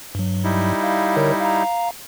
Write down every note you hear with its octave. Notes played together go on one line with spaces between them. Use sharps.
G2 F#3
G3 D#4 E4
F5
D3 A#4 C#5
F5 A#5